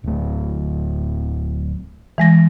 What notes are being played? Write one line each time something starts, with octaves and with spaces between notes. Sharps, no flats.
D1 A3
E3 G#3 A#6